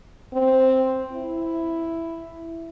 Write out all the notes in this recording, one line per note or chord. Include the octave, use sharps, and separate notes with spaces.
C4
E4